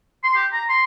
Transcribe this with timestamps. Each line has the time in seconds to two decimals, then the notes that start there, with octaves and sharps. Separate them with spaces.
0.24 C6
0.35 G4
0.53 A#5
0.69 C6